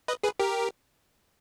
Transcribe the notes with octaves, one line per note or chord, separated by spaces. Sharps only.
B4 D#5
G#4 B4
G4 A#4